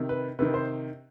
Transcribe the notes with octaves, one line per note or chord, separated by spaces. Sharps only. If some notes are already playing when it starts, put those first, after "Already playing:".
Already playing: C3 D#3
B4
C3 D#3 B4
C5